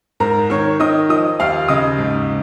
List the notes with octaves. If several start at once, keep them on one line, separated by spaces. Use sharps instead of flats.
G#2 A#4 A#5
D#3 C#5 C#6
D#3 D#5 D#6
F3 D#5 D#6
D#2 F5 F6
C#3 D#5 D#6
G#2